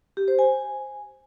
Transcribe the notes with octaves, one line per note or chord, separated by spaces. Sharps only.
G4
C5
G#5